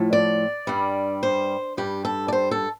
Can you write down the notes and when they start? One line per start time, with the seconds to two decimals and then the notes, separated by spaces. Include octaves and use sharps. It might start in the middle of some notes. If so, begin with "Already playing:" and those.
Already playing: A2 F3 A3
0.13 D5
0.67 G2 G3
1.23 C5
1.77 G2 G3 G4
2.05 A4
2.28 D5
2.33 C5
2.51 A4